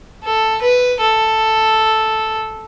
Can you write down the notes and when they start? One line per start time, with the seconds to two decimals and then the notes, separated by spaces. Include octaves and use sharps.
0.24 A4
0.62 B4
1.00 A4